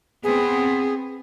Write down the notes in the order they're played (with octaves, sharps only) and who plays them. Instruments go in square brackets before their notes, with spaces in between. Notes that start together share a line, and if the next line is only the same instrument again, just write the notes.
[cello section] B3 C4 [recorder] G#4